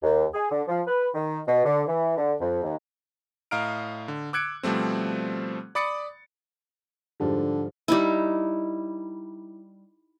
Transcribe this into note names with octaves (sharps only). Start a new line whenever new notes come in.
D#2
G#4
D3
F3
B4
D#3
B2
D3
E3
D3
F2
D#2
A2 D#5 F5 A#5 F6 D7
D3
D6 E6 F#6 G#6 C#7 D7
B2 F3 G3 A3 C4
D5 B5 D6 D#6 A6 C#7
G#2 D3 F3 G3
G3 D#4 E4